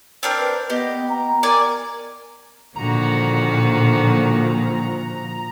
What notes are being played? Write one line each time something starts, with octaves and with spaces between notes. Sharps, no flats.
C4 D4 A#4
B4
B3 G4 D#5
B3 A#5
A#4 D5 G#5
A#2 D3 D#3 F3 F#4 A#5